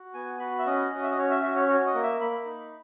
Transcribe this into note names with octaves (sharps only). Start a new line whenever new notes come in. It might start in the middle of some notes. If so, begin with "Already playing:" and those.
Already playing: F#4
B3 G#5
F#4 B5
E5
C#4 D#5
F#4
E5
D#5
C#4 C#5
E5
F#4 E5
C#5
F#4 C#5
D#5
A#3
E5
A#3 B5
D#4